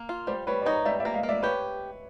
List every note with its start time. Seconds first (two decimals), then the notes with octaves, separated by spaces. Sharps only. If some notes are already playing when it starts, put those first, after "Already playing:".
Already playing: A#3
0.09 F4
0.27 G3 C5 D5
0.47 G3 B4 C#5
0.62 D5
0.66 D#4 C#5 D#5
0.85 G3 D5 E5
1.00 D5 E5
1.05 A#3
1.14 D#5 F5
1.23 A#3
1.29 D5 E5
1.43 G4 B4 C#5